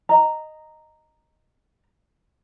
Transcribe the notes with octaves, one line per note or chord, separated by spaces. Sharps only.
D#5 A#5